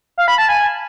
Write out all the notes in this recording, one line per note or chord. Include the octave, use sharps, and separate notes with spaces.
F5
B5
A5
G#5